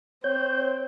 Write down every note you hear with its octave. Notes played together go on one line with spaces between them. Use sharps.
C4 C#5 G6